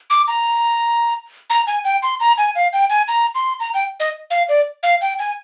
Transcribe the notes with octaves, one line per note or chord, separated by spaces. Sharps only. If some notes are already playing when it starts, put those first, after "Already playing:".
D6
A#5
A#5
G#5
G5
C6
A#5
G#5
F5
G5
G#5
A#5
C6
A#5
G5
D#5
F5
D5
F5
G5
G#5